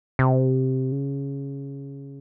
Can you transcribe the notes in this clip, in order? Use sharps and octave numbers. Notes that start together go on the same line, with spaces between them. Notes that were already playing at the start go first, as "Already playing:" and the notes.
C3
C#3